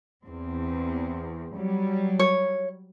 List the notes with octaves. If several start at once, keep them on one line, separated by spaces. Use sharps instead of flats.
E2 C4
F#3 G3
C#5